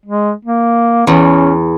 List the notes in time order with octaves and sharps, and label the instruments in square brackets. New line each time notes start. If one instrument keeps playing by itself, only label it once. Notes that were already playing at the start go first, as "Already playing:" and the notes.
[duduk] G#3
A#3
[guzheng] E2 [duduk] C#4